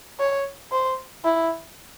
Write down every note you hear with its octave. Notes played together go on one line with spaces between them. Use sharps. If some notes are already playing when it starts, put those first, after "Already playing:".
C#5
C5
E4